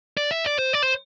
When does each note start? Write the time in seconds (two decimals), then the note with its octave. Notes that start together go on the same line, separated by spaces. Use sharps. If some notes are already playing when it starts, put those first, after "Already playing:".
0.17 D5
0.31 E5
0.45 D5
0.59 C5
0.73 D5
0.82 C5